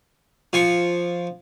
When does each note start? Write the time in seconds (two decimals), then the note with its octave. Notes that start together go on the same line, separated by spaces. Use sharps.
0.53 F3 G#5 C#6